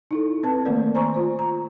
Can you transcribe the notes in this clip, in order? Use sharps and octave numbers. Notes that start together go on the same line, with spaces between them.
D#4 E4 A4
C4 B4 A5
D#3 A3 A#3 A#4 D5
C5 G#5 A#5 C6 C#6
F4 C5
A#5